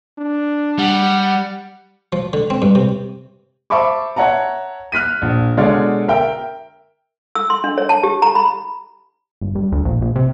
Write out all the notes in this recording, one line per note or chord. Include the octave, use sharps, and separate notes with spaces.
D4
G3 F#5
F3
D3
C4
G2
C3
C5 E5 A5 B5 C#6 D6
C#5 E5 F#5 A5 A#5
F6 F#6 B6 D#7
A#1
B2 D3 G#3 C#5 D5 F6
A#4 E5 G5
E6
C6
D4
C#5
A5
G4
A#5
B5
G1
G2
D2
A#1
A#1
C3